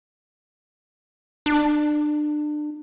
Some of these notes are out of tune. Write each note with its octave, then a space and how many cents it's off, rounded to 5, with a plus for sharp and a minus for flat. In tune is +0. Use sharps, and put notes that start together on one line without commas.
D4 +30